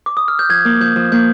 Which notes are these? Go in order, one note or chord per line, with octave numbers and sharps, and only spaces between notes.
D6
D#6
F6
G6
F3 G#6
A#3
F3 G6
F3
A#3 G6